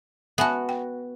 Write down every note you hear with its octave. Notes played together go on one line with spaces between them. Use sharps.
B3 F#4 E5 G#5 A5
G5